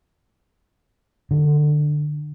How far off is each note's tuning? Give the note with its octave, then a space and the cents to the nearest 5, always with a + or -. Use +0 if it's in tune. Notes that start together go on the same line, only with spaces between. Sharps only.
D3 +20